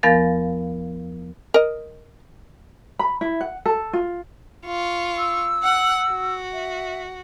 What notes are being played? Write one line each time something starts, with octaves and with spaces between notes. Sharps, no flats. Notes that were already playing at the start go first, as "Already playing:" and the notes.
E2 F3 B3 A#4 F5 A6
A#4 D#5
B5
E4
F#5
A4
F4
F4 C#6
E6
F#5 F#6
F#4
E5